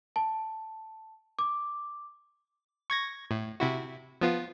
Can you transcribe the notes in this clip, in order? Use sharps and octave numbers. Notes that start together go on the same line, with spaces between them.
A5
D6
C#6 G#6 A#6
A2
C3 E4 F#4
F3 B3 F4